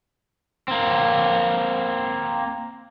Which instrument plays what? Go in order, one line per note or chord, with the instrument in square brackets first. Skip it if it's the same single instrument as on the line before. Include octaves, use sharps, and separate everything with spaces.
[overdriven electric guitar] A#3 C4